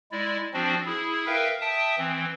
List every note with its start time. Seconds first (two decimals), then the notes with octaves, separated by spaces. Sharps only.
0.12 G#3 E4 D5
0.54 F3 C4 D4 F#4
0.86 E4 G#4
1.26 A#4 B4 E5 F5 G5
1.61 E5 G5 A5 D#6
1.98 E3 C4